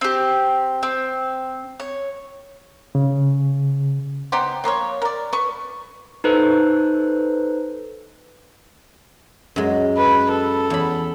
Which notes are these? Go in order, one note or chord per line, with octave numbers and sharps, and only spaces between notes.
C4 G4
C4
C#5
C#3
B3 D#4 G4 C5
F3 A#3 F4 C#5
A#4 D5
B4 C#6
D#4 A4 B4 C5
F#2 G#3
B4
A4
E2 B5